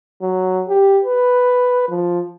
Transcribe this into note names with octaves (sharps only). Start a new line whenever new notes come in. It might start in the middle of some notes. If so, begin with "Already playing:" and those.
F#3
G4
B4
F3